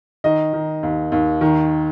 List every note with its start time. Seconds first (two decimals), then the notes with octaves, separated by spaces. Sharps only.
0.24 D#3 D#5
0.53 D#3
0.83 D#2
1.12 D#2
1.41 D#3